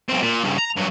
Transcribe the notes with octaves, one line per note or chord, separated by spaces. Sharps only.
B1 C4
A#2
G2 C#3
A#5
G2 F#3